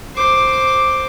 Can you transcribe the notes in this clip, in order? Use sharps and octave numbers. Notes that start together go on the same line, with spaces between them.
C5 D6